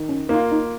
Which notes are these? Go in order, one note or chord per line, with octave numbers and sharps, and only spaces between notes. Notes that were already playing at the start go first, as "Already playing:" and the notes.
Already playing: D#3
C#4
A#3 D#4 F4
D#4